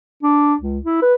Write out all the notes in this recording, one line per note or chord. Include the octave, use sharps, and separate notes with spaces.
D4
C#2
E4
B4